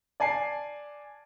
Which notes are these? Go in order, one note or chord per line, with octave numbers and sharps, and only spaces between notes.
D5 G#5 A5 C7